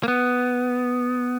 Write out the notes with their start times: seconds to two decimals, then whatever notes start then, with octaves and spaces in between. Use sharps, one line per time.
0.03 A#3
0.08 B3